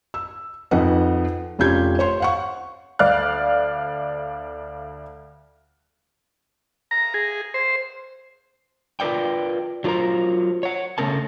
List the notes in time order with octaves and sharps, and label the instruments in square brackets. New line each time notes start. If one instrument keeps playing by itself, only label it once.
[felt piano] E6
F2 F3 D#4 B4 D#5 F#5
F1 C#4 F4 G4 G6 G#6
C5 C#5 C6
F5 F#5 C#6
[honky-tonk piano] D2 D5 F5 F6 F#6
[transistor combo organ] A#5
G#4
C5
[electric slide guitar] F4 A#4 B4 D5 G5
F#3 F4 A#4 C5 A#5
C#5 F#5
C#3 E3 A3 C#4 A#4 A5